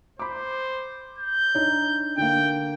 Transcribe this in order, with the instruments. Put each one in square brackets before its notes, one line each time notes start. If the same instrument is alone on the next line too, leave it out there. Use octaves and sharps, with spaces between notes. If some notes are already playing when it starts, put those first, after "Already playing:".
[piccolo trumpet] C5 [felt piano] B5 D6
[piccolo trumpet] G6
[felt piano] D4 D#4 C#5
[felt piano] D3 A#3 [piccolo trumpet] G5